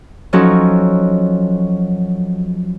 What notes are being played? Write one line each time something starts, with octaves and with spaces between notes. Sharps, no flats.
F3 F#3 C#4 D#4 F#4 A4